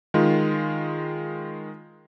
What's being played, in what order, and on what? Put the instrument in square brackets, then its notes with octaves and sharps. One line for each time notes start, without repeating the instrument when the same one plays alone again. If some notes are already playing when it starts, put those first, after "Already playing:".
[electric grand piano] D#3 G#3 F4